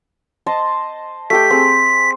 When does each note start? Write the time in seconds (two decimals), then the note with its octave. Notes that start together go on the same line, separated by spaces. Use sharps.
0.46 C5 D#5 A5
1.30 A3 G4 G5 B6
1.50 C4 G#4 C5